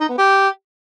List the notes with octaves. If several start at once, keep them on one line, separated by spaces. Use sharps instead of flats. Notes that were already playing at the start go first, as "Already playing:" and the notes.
D#4
B3
G4